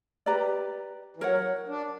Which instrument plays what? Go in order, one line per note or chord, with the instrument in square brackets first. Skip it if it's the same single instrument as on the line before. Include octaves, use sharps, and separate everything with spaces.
[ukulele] G4 B4 D5 A#5
[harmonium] E3
[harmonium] F#3 [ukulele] A#4 C#5 F#5
[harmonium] D4